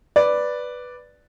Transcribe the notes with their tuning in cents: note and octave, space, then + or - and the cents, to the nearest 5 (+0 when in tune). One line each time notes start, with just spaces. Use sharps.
B4 +0 D5 +0